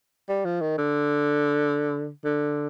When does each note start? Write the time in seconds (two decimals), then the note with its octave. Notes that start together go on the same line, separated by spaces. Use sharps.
0.29 G3
0.45 F3
0.61 D#3
0.78 D3
2.25 D3